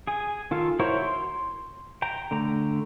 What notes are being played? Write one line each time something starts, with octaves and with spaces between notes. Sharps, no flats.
G#4 G#5
D#3 F4 A4 F5
E4 F#4 A#4 C5 C#5
C6
G5 A#5
D3 A3 A#5